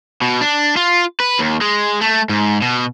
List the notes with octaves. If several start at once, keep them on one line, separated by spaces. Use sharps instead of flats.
B2
D4
F4
B4
D#2
G#3
A3
G#2
B2